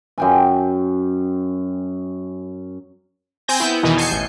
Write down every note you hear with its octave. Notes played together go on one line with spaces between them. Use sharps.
F#2 G5 G#5
C4 G#5 G6 A#6
B3 E4
E2 B2 D#3 E3 D#4
G#5 A5 G6 C7 C#7
A1